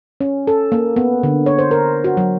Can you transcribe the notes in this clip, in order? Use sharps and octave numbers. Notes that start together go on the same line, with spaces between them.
C#4
A4
A#3
B3
D3
C#5
C5
A#4
F#4
F#3